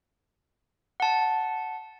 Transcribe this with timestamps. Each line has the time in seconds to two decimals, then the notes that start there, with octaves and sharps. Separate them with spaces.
1.00 F#5 A5